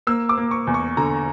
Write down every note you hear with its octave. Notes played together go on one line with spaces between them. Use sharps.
A#3 E6
D6
A#3
C#6
E2
C#6
D3 A#5